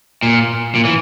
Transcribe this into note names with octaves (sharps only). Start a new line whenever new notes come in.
A#2
A#2
E3